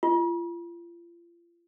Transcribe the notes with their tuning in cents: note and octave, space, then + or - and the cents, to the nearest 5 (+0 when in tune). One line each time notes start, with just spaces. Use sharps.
F4 -35